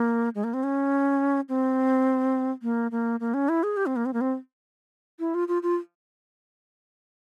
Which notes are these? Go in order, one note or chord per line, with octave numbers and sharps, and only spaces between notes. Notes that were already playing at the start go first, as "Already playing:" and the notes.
Already playing: A#3
G#3
A#3
C4
C#4
C4
A#3
A#3
A#3
C#4
E4
G#4
G4
C4
A#3
C4
A#3
C4
E4
F4
F4
F4